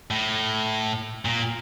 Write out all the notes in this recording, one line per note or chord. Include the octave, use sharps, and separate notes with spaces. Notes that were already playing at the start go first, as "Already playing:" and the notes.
A2
A#2